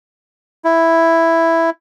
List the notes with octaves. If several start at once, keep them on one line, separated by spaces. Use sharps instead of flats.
E4